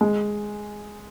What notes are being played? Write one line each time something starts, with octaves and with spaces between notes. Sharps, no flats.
G#3